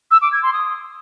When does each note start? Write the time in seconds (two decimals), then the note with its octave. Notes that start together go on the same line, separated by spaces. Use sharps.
0.11 E6
0.21 D6
0.32 G#6
0.42 C6
0.53 D#6